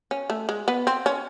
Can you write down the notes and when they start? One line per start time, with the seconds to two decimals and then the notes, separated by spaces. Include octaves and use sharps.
0.11 C#4
0.30 A3
0.49 G#3
0.68 B3
0.87 C4
1.06 C#4